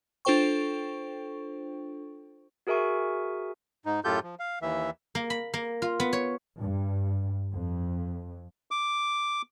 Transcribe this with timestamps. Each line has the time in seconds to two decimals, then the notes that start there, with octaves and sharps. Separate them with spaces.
0.25 D4 F4 A4 C5 G5 C#6
2.67 F#4 G#4 A#4 E5 G#5 C#6
3.86 G#2 D#4
4.04 F#2 A2 F4 G4 A4 G6
4.23 F3
4.39 F5
4.62 D#2 E3 E5
5.15 A#3
5.30 B5
5.54 A#3
5.82 F4
6.00 B3
6.13 C#5
6.58 G2
7.51 F2
8.71 D6